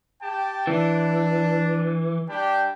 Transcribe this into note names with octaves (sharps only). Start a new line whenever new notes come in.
G4 G5 A5
E3 D4
G3 D4 G4